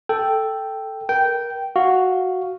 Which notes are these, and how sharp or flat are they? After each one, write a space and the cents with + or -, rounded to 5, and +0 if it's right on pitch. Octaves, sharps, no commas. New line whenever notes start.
A4 +0 G5 +0
A#4 +25 G5 -10
F#4 +0 F5 +0